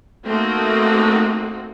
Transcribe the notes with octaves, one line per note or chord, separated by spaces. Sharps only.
A3 A#3 C4 D#4 F#4